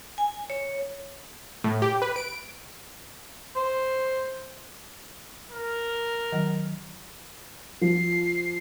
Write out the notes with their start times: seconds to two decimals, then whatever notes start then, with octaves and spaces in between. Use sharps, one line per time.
0.18 G#5
0.50 C#5
1.64 A2
1.82 G4
2.02 B4
2.16 D7
3.56 C5
5.51 A#4
6.32 D#3 F#3
7.81 F3 C7